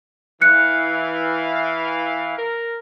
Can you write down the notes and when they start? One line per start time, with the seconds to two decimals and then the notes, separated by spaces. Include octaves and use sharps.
0.41 E3 F5 F#6 C#7
2.37 A#4